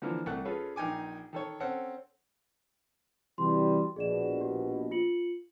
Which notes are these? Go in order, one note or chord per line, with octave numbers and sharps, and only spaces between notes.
D3 E3 F3 A#3
C2 A3 F#5 A5 F#6
C#4 F4 G#4 A4 B4
A#1 D#4 G5 G#5 D6
D#3 A4 C#5
C4 C#4 A4 F#5
C3 E3 G3 F#4 C6
A#1 B2 G#4 D5 E7
G4
F4 C#7 F#7